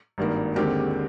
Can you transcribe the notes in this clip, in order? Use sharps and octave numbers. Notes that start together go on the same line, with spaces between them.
G#1 G2 D#3 A#3
D#2 D3 G#3 C4 G4 A#4